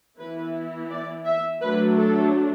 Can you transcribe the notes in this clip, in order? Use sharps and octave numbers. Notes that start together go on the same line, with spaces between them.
E3 B3 E4 B4
D5
E5
F#3 A3 D4 B4
A4